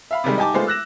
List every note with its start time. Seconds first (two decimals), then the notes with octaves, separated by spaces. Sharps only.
0.11 E5 F5 B5
0.24 C3 D#3 G3 G#3
0.38 D#4 G4 G#5 A5 D6
0.54 G#3 A3 B3 F4 G#4 C5
0.67 E6 F#6 A#6 E7